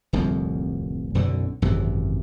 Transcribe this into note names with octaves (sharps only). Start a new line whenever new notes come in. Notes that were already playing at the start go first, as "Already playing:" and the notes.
D1 C2 F2 F3
B1 F#2 D3
G#1 F#2 C3 E3